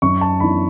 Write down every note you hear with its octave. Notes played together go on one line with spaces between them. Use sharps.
F#2 C#6
A5
E3 B3 D4 B5